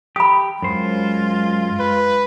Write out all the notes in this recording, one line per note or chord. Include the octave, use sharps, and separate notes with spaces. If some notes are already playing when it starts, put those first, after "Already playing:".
G4 B5 D#6
F#2 G#3 F4 C5
B4